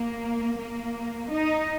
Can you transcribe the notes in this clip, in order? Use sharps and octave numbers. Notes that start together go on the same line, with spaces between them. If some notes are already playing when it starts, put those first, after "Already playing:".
Already playing: A#3
A#3
D#4